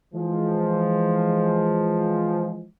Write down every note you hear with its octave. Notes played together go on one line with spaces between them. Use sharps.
E3 F3 G#3